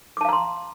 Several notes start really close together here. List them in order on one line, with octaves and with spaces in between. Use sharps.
D6 A5 F5 A#5 C6